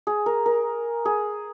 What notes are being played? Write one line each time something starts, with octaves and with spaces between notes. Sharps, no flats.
G#4
A#4
A#4
G#4